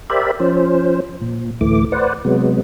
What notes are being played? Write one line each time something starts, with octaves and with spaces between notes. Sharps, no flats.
G4 A#4 C5 D5 E5 B5
F3 C#4 C5
A#2
D2 A2 E3 A3 D6
B4 C5 D5 F#5
C3 F#3 G#3 B3